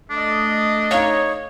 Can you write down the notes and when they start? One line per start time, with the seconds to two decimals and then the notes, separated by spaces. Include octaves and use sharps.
0.10 A3 D4 D#5
0.91 D#4 C#5 F5